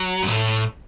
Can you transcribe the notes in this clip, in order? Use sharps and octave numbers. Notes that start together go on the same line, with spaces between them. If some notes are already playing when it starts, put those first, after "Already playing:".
Already playing: F#3
G2
A2